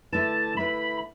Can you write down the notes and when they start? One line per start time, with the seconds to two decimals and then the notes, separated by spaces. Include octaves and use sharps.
0.12 D3 A3 E4 B4 A5
0.56 D3 A3 E4 B4 B5